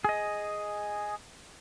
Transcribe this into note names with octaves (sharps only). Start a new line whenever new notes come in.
G#4 D#5